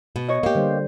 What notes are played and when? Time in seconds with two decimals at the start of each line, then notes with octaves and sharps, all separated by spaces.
0.16 B2
0.28 C#5 D#5
0.43 A#3 G4
0.55 D3 G3 C5